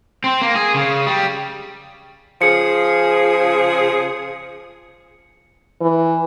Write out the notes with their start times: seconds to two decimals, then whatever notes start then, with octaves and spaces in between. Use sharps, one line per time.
0.24 C4
0.42 A#3
0.56 G#4
0.75 C#3
1.07 G3
2.42 C#3 F3 G#4 C#7
5.81 E3